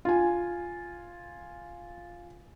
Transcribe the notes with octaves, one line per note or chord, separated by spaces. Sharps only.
F4 G#5